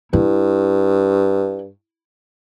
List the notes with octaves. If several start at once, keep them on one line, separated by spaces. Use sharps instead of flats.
G2 E4